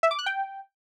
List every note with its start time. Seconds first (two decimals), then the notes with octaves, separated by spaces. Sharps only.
0.03 E5
0.11 D6
0.19 F#6
0.26 G5